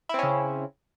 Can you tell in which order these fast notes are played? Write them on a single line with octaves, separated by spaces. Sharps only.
E4 C4 C#4 C#3